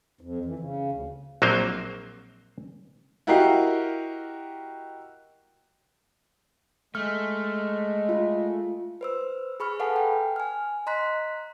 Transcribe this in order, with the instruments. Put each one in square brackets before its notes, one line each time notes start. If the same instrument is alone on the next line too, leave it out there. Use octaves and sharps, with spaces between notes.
[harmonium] F2
E3
C#3
D2
[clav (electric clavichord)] A#1 F#3 A#3 C4 C5
[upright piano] E4 F#4 G4 A#4 D#5 F5
[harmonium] G#3 [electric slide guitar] A3 [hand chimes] F6
[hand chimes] F4
B4 C5 E6
G#4 B5 C#6 F6
A4 B4 F5 F#5 G#5 A5
G5
G#5 F6
D#5 A#5 C6 F#6 B6